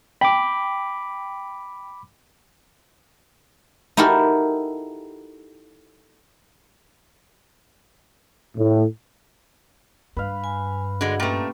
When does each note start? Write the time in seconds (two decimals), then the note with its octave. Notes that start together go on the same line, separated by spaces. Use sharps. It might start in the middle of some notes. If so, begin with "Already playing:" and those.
0.21 G5 B5 D6
3.97 D#4 E4 F#4 G4 A4 A#4
8.57 A2
10.17 G2 B4 F5
10.44 G#5
11.01 D3 G#3 F#4 G#4 F#5
11.20 A#2 A3 A#3 C#4 G4 B4 C6 C#6